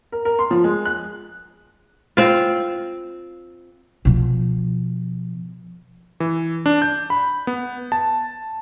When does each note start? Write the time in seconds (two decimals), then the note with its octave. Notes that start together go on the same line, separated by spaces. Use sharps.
0.12 A#4
0.25 A#4
0.39 C6
0.51 F3
0.64 G#3
0.85 F#6
2.17 C4 F4
4.05 B2 F3
6.20 E3
6.66 D4
6.82 G6
7.10 B5
7.47 B3
7.92 A5